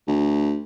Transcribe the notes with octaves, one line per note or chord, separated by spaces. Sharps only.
D2